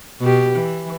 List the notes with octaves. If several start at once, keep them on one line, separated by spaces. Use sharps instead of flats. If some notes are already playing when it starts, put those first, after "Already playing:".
B2 G4
E3